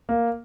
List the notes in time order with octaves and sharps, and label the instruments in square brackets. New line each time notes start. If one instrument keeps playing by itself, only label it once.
[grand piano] A#3